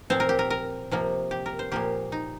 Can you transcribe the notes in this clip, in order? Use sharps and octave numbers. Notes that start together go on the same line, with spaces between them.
A#2 F3 C4 C5
A#4
G4
A#4
A#4
C3 F3 A#3
G4
A#4
C5
A#2 F3 A#3 G4
D#4